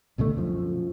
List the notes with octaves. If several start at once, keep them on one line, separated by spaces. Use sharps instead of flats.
C2 B2 D3 A3
F#2 F3